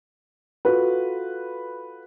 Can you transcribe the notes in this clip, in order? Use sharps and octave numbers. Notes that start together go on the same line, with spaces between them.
F4 F#4 A4 B4